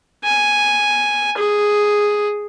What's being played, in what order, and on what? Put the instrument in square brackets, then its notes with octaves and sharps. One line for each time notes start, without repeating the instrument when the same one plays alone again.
[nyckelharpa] G#5
G#4